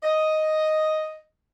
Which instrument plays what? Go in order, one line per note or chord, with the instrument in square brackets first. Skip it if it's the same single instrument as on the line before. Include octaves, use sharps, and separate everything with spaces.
[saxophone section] D#5